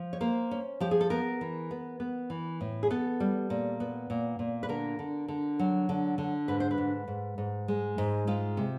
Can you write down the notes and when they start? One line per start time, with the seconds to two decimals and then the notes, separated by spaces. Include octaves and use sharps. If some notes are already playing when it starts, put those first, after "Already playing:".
Already playing: F3
0.13 C#5
0.21 A#3 C5
0.51 C#4
0.80 F3 G4
0.91 G#4
1.01 A4
1.10 B3 A#4
1.41 E3
1.71 B3
2.00 B3
2.30 E3
2.61 A2
2.83 G#4
2.90 B3 A4
3.20 G3
3.50 A#2
3.80 B3
4.10 A#2
4.39 A#2
4.63 B4
4.69 D3 A#4
4.99 D3
5.28 D3
5.59 F#3
5.89 D3
6.18 D3
6.48 G#2 B4
6.60 C5
6.71 B4
6.78 G#2
7.08 G#2
7.38 G#2
7.68 G#3
7.98 G#2
8.27 G#3 F4
8.57 C3